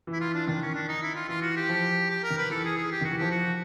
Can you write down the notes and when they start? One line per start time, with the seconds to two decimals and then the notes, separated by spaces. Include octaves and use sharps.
0.07 E3
0.12 E4
0.20 F4
0.34 D4
0.47 D#3 D4
0.61 C#4
0.74 D4
0.88 D#4
1.02 E4
1.16 F4
1.29 E3 F4
1.42 F#4
1.56 G4
1.69 F3
2.10 G4
2.23 A#4
2.30 D#3
2.37 B4
2.50 E3 A4
2.65 G#4
2.77 G#4
2.92 G4
3.01 D#3 F#4
3.12 E3
3.18 F3 G4
3.31 F#4